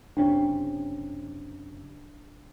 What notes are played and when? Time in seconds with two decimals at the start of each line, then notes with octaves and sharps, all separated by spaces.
0.17 F#1 C3 C#4 D4